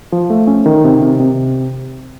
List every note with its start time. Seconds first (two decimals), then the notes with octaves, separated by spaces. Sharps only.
0.12 F3
0.30 A3
0.47 C#4
0.66 D#3
0.84 C3
1.02 C3
1.20 C3